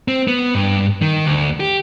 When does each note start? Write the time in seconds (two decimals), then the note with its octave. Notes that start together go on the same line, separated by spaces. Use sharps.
0.08 C4
0.28 B3
0.55 G2
1.02 D#3
1.26 D2
1.60 G4